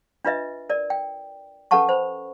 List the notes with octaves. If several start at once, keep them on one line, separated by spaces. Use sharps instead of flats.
D4 F4 B4 D#5 E5
A#4 D5
G5
C#4 A4 B4 F#5 A5 C#6
C5 B5